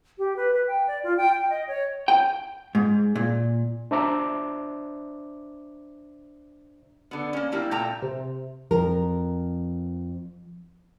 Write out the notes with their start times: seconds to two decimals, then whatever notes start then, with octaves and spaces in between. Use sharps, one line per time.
0.18 G4
0.36 B4
0.54 B4
0.68 G5
0.87 D5
1.03 F4
1.17 G5
1.32 G5
1.50 D#5
1.68 C#5
2.08 G5
2.75 G#2
3.15 A#2
3.91 D4 C5 D5 E5 A#5 D6
7.11 D3 B3
7.33 A#3 C#4
7.52 G3 A#3 E4
7.71 A#2 A3 G5 A#5
8.02 C3
8.71 F2 F3 A#4